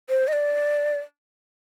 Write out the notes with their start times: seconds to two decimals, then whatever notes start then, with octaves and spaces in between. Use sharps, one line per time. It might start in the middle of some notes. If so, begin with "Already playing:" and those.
0.09 C5
0.28 D#5
0.33 D5